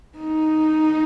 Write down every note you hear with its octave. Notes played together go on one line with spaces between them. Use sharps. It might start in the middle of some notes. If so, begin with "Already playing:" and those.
D#4